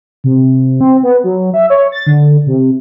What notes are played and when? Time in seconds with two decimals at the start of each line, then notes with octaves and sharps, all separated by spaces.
0.24 C3
0.81 C4
1.03 B3
1.24 F#3
1.54 E5
1.70 C#5
1.92 A6
2.07 D3
2.46 C3